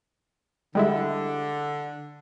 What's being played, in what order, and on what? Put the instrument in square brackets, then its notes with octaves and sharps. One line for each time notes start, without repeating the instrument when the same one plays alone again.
[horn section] D3 [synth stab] G3 G#3 E4